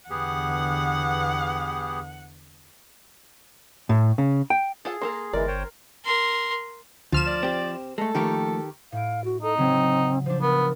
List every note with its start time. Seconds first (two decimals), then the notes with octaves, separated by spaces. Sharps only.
0.10 E2 D3 B3 G4 G#4 F#5
3.89 A2
4.18 C#3
4.50 G5
4.85 F4 G#4 A4 F#5
5.01 A#3 A4 A#4 C6
5.33 G1 E3 G#3 A#4 D5
5.48 C5 C#5 G5
6.05 A#4 C6
7.12 D2 F3 F6 E7
7.26 D5
7.43 C4 G4
7.98 G#3 A3 A4
8.14 D#3 F3 A3 A#3 G4
8.92 A2 F5 D7
9.25 F#4
9.43 D#4 A4
9.58 C#3 F#3 C4
10.26 F3 D4 C5
10.42 B3 A#4